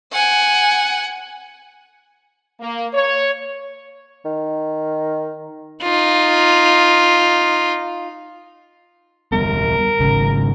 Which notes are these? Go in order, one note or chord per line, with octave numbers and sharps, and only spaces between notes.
F#5 G#5
A#3
C#5
D#3
D#4 F4
D#1 G3 B3 A#4
G#1 C#3